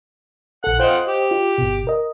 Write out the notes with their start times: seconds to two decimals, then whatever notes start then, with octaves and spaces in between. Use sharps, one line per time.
0.64 A#1 A4 F#5
0.80 F4 C5 D#5 F#5 G5
1.08 G4
1.31 F4
1.58 G1 B2
1.87 A#4 D#5